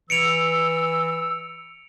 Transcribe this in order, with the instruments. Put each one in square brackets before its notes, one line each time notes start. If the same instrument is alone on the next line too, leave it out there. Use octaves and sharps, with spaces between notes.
[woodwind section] E3 E6 [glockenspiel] C#7 D7 F7